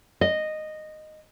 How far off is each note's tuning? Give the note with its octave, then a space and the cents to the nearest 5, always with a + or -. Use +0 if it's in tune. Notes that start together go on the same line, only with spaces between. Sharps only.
D#5 -10